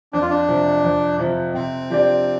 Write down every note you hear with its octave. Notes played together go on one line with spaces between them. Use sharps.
F2 D4
F4
D4
C3 F3
F2
C3 F3
C3 C4
F3 D4 G4 D5